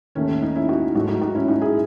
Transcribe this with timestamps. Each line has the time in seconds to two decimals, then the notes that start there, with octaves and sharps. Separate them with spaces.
0.15 D#2 D#3 A3 C#4
0.29 C#4
0.42 D#4
0.55 C#4 E4
0.69 D#4 F#4
0.95 G#2 F#3 A3 D#4 F#4
1.08 D#4 F#4
1.21 D#4 F#4
1.35 C#4 E4
1.48 D#4 F#4
1.61 E4 G#4